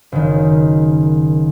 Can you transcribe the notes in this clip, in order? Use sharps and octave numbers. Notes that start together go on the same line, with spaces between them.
F#1 D#3